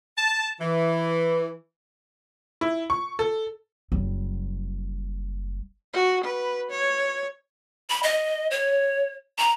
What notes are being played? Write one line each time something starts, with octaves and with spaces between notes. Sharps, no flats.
A5
E3
E4
C#6
A4
F#1 G3
F#4
B4
C#5
B5
D#5
C#5
A#5